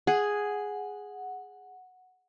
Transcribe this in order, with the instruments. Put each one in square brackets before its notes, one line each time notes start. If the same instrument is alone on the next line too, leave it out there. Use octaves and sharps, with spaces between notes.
[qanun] G#4 [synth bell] F#5